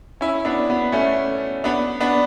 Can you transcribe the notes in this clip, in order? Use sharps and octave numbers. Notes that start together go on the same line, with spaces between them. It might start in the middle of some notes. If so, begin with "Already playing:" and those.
C#4 E4
B3 D4
B3
A3 C#4
B3 D4
B3 D4